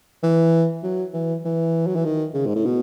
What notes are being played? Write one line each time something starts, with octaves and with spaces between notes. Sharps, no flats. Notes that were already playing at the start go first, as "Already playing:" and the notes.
E3
F#3
E3
E3
F#3
E3
D#3
C#3
G#2
A2
B2